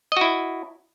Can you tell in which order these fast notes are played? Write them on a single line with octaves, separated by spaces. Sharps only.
D#5 F#4 E4